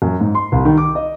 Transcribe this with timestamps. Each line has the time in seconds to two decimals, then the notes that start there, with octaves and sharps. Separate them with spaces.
0.02 F#2
0.20 G#2
0.35 C6
0.52 C2
0.65 D#3
0.77 D6
0.95 D#5